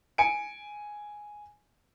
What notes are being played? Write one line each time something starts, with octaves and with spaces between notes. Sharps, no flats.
G#5 C#7 D7